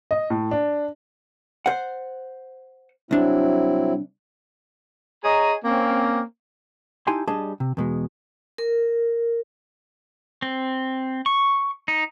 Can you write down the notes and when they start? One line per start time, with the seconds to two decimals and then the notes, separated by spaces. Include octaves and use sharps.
0.11 D#5
0.30 A2
0.51 D4
1.66 C5 F#5
3.11 C2 F#3 C4 D4 E4
5.23 G#4 C#5 D#5 G#5 A#5
5.65 A#3 C4 C#4
7.07 D#4 E4 G4 G#5 A5 C6
7.28 G3 D4 G#4 D#5 A5
7.60 C3
7.77 E2 B2 G#3
8.58 A#4
10.42 C4
11.26 C#6
11.88 D#4